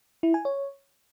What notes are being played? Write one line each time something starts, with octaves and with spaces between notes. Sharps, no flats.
E4
G#5
C#5